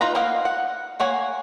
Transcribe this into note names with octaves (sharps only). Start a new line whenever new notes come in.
D#4 F4 B4 A#5
A#3 A#4 D#5 F5 F#5
F#5
A#3 C#5 F#5 G#5